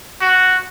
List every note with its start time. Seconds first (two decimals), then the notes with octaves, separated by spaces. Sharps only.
0.21 F#4